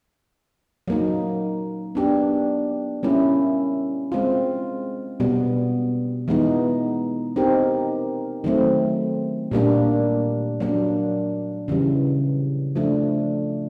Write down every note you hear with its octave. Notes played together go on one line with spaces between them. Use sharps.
F#3 A#3 D#4
B3 D4 G4
G3 A#3 C#4 E4
G#3 C4 F4
B2 G3 B3
E3 G#3 B3 D#4
C4 D#4 G4 A#4
D#3 F#3 A3 C4
A#2 G3 A#3 D4
F#3 A#3 D4
C#3 E3 G3
F3 A3 D4